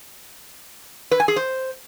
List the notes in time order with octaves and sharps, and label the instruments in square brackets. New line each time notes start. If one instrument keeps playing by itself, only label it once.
[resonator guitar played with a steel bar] B4
G#5
G#4
C5